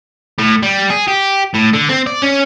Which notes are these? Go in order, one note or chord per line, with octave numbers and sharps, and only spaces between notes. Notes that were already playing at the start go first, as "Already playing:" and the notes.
A2
G3
G#4
G4
A2
D3
C4
D5
C#4